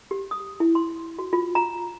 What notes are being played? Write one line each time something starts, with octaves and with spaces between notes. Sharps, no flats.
G4
D#6
E4
C6
F#4
F4
A#5